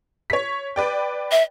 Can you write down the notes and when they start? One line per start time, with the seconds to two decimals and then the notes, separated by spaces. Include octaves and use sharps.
0.30 C#5 B6
0.76 B4 D5 G5
1.31 E5